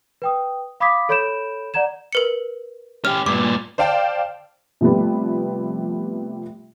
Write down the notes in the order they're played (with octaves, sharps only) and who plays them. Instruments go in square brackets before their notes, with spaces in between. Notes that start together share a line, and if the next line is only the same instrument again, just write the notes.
[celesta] B4 G5 D#6
F5 B5 D6 D#6 G#6 B6
A4 C#5 B5 G6 D7 E7
D5 F#5 A#5 G#6 E7
[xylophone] A#4 B4 C#7
[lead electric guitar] C#4 G4 [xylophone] F6
[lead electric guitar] G2 A#2 [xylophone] D6
[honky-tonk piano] C5 D5 F5 G5 A5
C3 F3 G3 A3 B3